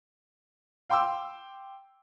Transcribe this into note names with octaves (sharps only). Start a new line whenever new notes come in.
F5 G5 C6 D6 E6